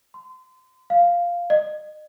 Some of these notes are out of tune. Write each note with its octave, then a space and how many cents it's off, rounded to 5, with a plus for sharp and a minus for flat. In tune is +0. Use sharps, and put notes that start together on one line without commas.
C6 -30
F5 -5
D#5 -35